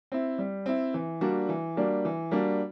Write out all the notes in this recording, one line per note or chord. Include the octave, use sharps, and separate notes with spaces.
C4 E4
G3
C4 E4
E3
G3 A#3 D4 F#4
E3
G3 A#3 D4 F#4
E3
G3 A#3 D4 F#4